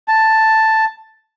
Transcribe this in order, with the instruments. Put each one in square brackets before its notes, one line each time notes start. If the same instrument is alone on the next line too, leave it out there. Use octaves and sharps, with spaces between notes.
[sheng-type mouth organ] A5